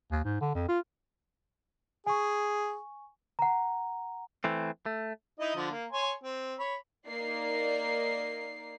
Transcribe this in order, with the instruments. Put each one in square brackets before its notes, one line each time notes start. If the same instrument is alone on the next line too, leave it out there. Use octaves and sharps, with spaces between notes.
[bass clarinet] D#2
G#2
D3
F2
F4
[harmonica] G#4 [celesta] G#5 C#6
[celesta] F#5 A#5
[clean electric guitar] E3 A3 C4
A3
[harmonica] D#4 E4 D#5
D3 F3
A#3
C#5 G#5 C6
C4
C#5 B5
[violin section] A#3 D#4 D5 C7